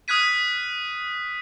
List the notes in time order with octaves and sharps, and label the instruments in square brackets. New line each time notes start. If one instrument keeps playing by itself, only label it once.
[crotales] D#6 F6 F#6 G#6 B6 D#7